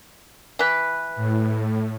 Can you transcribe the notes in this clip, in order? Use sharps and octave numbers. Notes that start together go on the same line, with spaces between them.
E3 B4
A2